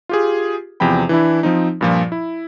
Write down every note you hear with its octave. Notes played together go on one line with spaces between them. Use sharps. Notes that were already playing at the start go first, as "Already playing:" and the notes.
F4 G4 G#4
E2 C3 F3 G5 B5
E3 D4 E4
F3 C4 D#4
G2 A#2 F3
E4